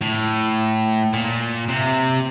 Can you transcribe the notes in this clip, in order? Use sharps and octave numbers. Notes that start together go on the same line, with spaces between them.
A2
A#2
C3